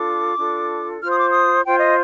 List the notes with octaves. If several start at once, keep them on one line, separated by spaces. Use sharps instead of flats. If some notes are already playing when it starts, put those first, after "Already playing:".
Already playing: D4 F4 A4 D6
D4 F4 A4
F4 C5 F6
D#6
D6
D#6
F4 C5 G5
D#5